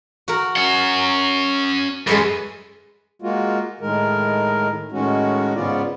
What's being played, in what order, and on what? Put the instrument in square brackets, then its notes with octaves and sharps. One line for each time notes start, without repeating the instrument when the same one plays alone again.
[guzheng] F#4 A#4
[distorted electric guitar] C#4 F#5
[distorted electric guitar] F#2 [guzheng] G#3 A4 B4
[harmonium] G#3 A#3 F4 F#4
A2 D#3 G#3 A#4
A2 D#3 G#3 C#4 F#4
G#2 C#3 B3 C#4 F4 D5